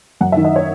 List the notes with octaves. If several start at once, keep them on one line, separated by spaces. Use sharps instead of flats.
F#2 F#5
E5
D#3
D#5
C#5